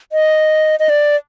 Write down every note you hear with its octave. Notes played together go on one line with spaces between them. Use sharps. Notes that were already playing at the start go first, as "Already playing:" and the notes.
D#5
D#5
D5